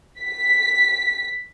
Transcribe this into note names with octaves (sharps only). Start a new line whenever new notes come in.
B6